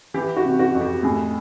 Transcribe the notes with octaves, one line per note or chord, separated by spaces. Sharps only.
E3 G4
F#4
C3
F#4
F2
G4
A2 G#4